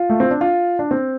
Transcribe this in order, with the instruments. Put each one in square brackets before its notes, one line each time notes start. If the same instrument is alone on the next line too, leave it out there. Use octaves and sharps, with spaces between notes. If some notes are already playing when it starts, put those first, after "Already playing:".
Already playing: [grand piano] F4
A3
C4
D4
F4
D4
C4